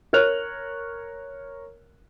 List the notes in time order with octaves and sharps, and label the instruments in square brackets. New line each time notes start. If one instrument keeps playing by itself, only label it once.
[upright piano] A#4 C#5 F6 F#6 F7